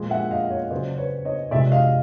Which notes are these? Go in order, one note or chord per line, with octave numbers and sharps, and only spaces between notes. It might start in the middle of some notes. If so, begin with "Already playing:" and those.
Already playing: A#2 F3 G#3
E5 F#5
D#5 F5
C#5 D#5
C#3 F#3 C5 D5
B4 C#5
C#5 D#5
C3 F3 G#3 D5 E5
D#5 F5